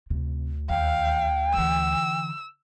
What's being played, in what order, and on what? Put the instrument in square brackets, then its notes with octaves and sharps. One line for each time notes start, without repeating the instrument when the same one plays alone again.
[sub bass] D2 [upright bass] C3
[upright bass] D#2 [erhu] F5 [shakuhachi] G5
[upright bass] D3 E3 [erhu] E6